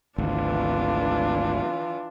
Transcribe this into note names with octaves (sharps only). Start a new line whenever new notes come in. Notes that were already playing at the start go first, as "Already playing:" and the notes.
G#1 D2 E3 D4 F4